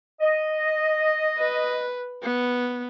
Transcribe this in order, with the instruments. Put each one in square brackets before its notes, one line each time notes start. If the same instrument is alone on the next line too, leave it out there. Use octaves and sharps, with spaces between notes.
[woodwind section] D#5
[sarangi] B4
B3